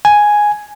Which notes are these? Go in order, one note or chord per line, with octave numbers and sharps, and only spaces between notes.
G#5